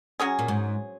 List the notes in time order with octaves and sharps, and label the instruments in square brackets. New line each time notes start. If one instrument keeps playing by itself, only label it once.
[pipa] F#3 C#4 G#4
[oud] A#2
G#2